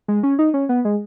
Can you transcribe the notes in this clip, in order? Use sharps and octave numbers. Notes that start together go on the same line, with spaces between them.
G#3
C#4
D#4
C#4
B3
G#3